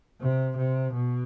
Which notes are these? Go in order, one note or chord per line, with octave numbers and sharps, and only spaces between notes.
C3
C3
B2